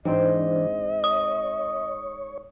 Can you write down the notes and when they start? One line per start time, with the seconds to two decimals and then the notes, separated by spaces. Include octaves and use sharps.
0.05 G#2 E3 C4 D4 C5 D#5
1.04 C#5 D#6